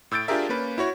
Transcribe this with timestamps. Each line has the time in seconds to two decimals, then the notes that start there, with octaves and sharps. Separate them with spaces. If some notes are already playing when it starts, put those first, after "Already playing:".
0.11 A2 E6 G6 A6 D7
0.28 D4 F4 G4 G#4 A#4 E5
0.49 A#3 C#4 B4
0.78 E4 F#4 C#5